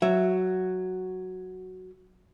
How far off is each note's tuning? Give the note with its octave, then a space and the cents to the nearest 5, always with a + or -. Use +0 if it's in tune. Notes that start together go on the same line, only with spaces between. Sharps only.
F#3 +0 E5 +10